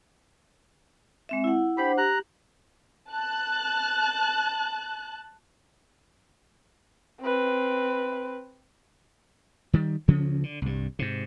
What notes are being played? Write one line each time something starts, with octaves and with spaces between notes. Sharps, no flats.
G#3 C4 E5
E4 F#5
D4 G4 C5 F#5 B5
G4 A#5 F#6
A5 F#6
C4 B4
D#3 G3
D2 C#3 F3 C#4
D3
C2 G2
G#2 C3